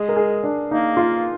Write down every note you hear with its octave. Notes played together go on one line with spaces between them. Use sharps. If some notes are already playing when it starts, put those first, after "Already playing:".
Already playing: G#3 G#4
A#4
G#4
D4
A#3 D#4
F4